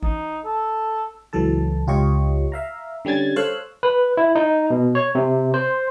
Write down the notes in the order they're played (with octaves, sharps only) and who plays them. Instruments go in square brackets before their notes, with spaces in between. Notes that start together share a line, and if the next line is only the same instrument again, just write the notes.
[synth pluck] A1 [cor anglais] D#4
[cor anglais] A4
[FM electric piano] C#2 E3 F#3 A4 A5
C#2 F4 G4 C#5 D#5 C#6
E5 F5 A#5
D3 G3 C#4 G#6 A6
A4 C5 C#5 F5 E6 F#6
[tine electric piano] B4
E4
D#4
B2
C#5
C3
C5